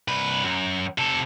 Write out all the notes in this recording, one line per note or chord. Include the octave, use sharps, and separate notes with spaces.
C2 B4
F#2
C3 A4